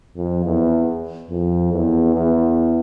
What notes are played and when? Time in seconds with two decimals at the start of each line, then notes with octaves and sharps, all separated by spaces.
0.16 F2
0.45 E2
1.30 F2
1.72 E2
2.15 E2